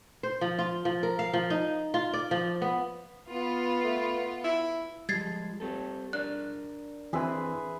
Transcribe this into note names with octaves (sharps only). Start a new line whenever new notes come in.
C5
F3
F4
F3
A#4
F5
F3
D#4
F4
D5
F3
B3
B3 F4
A3
E4
F3 G3 G#3 G#6 A6 C7
C4 G4 A4
D4 A#4 D5 F#6
E3 C4 G#4 B4 E5 C6